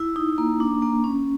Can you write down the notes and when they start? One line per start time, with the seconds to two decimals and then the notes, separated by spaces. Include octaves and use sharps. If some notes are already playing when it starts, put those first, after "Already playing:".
Already playing: E4
0.16 D#4
0.38 A#3
0.60 D4
0.82 A#3
1.04 C#4